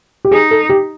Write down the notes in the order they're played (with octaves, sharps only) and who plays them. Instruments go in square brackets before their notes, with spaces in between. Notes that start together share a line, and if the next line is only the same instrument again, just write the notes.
[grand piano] G4
[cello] D#4 [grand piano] G#4
[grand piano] A4
G4